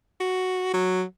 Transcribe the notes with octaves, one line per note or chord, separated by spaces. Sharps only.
F#4
F#3